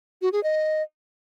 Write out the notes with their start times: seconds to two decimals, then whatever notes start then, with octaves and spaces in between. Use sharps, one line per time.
0.22 F#4
0.33 G#4
0.43 D#5